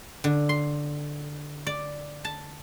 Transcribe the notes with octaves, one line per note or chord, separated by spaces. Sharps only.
D3
C6
D5
A5